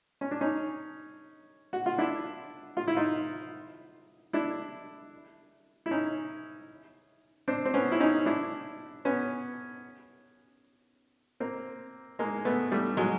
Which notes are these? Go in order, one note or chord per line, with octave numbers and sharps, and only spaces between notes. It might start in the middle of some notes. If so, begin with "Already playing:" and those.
C#4
D4
C#4 D#4
F#4
F4
D4 E4
F4
E4
D#4 F4
D4 E4
E4
C#4 D#4
C4 D4
C4
B3 C#4
E4
C#4 D#4
D4 E4
B3 C#4
A#3 C4
G#3 A#3
A3 B3
G3 A3
F#3 G#3